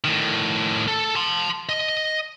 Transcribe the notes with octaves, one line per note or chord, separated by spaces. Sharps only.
A2 D#3
A4
A5 C6
D#5